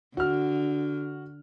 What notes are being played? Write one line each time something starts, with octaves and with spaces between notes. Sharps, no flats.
D3 F#4 F6